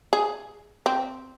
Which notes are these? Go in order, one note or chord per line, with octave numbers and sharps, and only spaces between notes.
G#4
C4